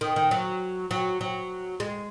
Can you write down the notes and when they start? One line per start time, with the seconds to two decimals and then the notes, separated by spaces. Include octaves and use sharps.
0.01 D#3
0.16 D#3
0.31 F#3
0.91 F#3
1.21 F#3
1.80 G#3